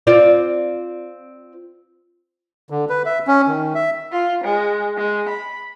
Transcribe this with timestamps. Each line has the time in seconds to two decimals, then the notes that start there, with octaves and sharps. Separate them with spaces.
0.07 C4 F4 D5
2.70 D3
2.89 B4
3.06 E5
3.27 C#4
3.48 D#3
3.75 E5
4.12 F4
4.44 G#3
4.98 G#3
5.29 B5